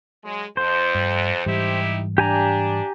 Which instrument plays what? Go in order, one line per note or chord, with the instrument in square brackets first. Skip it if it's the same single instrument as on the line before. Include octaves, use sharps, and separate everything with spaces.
[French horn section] F#3 G#3
[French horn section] F2 [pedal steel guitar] C5
[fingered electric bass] G2
[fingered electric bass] G#2 E3 G3 [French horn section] D#4 E4 G4
[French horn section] D4 [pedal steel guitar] G4 G#5 A#5